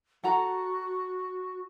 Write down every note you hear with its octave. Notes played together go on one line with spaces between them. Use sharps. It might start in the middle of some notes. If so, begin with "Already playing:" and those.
F#4 A4 F#5 A#5